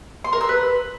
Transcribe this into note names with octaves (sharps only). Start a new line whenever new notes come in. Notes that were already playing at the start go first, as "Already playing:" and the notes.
C6
A#4
E6
B4